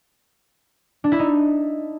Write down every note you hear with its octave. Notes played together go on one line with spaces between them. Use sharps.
D4
E4
D#4